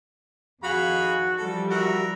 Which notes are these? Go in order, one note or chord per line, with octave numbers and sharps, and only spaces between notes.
F2 D#3 F#4 G#4 F5 B5
E3 F3 G3 A4
F#4 A#4 E5